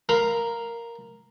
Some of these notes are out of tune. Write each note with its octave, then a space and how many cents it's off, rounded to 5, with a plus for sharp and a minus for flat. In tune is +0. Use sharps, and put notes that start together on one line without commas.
A#4 +0 F5 +0 B5 +30